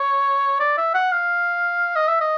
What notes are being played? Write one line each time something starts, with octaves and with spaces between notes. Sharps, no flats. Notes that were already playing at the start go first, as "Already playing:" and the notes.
Already playing: C#5
D5
E5
F#5
F5
D#5
E5
D#5